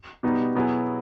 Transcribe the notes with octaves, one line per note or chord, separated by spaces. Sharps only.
B2 G3 B3 D#4 G4
B2 F#3 B3 E4 G#4